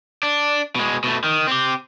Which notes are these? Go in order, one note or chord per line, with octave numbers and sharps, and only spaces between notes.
D4
B2 G#3
B2 A3
D#3
C4 G4